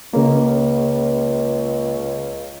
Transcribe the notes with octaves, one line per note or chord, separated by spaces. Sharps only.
C#2 C#3 A#3